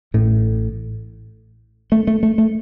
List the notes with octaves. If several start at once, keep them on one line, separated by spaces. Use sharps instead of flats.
A1 A2
A3
A3
A3
A3